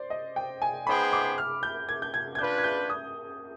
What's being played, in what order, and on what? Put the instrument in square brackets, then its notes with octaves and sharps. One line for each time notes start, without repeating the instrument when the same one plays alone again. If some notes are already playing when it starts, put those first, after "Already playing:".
Already playing: [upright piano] C5 D5
D#5
G5
G#5
[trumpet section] B3 D#4 G#4 C5 G5 [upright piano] B5
[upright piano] D6
F6
G6
G#6
G6
G#6
G#6
[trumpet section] D4 F4 B4 [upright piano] G6
[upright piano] G#6
G6
D#6